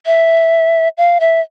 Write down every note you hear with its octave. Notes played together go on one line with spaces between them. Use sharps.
E5
F5
E5